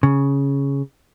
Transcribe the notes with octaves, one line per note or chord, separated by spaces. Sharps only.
C#3